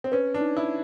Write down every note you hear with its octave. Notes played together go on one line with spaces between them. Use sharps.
C4
C#4 B4
D4
D#4
E4